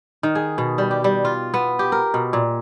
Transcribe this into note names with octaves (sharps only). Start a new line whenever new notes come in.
D#3
G#4
B2
G3
G4
G3
F4
B3
G4
A#4
B2
A#2